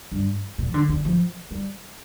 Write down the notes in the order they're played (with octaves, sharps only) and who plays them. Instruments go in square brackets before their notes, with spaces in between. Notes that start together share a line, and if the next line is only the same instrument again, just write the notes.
[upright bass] G2
A#2
F3
D3
D3
F3
G3